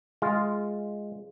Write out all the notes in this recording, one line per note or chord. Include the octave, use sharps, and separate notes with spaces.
G#3 F4